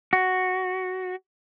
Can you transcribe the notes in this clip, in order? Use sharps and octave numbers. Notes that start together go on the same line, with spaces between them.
F#4